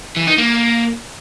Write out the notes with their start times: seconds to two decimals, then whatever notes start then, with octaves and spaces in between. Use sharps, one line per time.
0.16 E3
0.27 D#4
0.38 A#3